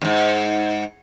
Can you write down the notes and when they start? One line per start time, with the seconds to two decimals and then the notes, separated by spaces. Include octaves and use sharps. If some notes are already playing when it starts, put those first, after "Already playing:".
0.01 E2 G#2